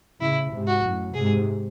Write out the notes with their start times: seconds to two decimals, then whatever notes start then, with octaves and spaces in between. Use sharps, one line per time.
0.20 A2 C#3 E4
0.51 G#2 C3
0.67 F#4
0.83 F#2 A2
1.14 G#2 C3 G#4